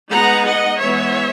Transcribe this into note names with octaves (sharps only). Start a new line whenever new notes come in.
G#3 B3 D#4 F#5 A#5
D#5 F#5
E3 G#3 B3 C#5 E5